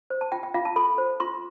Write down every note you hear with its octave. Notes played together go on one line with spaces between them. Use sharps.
C5
A5
F4 G5
G5
F4 F5
A5
A4 B5
C5
F4 C6